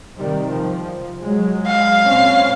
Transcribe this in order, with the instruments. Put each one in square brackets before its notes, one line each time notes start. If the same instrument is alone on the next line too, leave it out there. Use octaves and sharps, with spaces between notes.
[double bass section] C3 D#3 G3
F3
F#3 G#3
[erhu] F5
[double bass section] A#2 C4 C#4